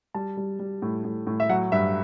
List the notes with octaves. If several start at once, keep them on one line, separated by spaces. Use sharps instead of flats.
G3 A5
G3
G3
A2
A2
A2
E5
F#3 F#5
G2 E5